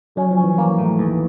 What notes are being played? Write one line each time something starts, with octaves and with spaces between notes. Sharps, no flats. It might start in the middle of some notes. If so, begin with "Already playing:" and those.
F#3 C#4
F3
C#4
E3
A#3
A2
D#2 E3